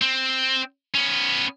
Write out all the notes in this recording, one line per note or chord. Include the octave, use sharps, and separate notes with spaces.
C4
B3 C#4